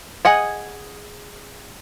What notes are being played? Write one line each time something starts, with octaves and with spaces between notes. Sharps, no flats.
G#4 D#5 F#5 G#5